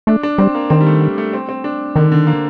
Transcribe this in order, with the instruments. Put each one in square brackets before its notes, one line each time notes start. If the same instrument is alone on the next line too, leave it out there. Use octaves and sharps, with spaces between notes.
[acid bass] A3 [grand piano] D4
[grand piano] D4
[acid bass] G3 [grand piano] C4
[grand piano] A#3
[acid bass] D#3 [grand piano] C4
[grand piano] G3
A3
G3
A3
C4
C4
D4
[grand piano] D3 [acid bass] D#3
[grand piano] D3
A#3